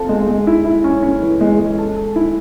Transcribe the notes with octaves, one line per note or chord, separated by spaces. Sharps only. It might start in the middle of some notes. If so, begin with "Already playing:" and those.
Already playing: C4 F4 A4
G#3
G#3
E4
E4
C#4
C#4
E3
G#3
G#3
A4
A4
E4